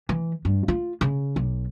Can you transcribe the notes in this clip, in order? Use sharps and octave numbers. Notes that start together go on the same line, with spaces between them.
E3
G2
F4
C#3
B1